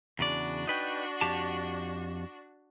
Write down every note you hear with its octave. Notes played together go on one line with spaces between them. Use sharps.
E2 C#3 D4 F#4 D5
D#4 B4 G5
F2 G4 A5